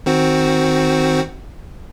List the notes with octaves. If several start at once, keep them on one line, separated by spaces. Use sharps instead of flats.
D#3 C4 F#4